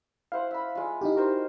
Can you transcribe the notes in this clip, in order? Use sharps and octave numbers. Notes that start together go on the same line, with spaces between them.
E4 C5 F5 F#5
E5 B5
G#3 F4
D#4 E4 G4
F#4 A#4 C5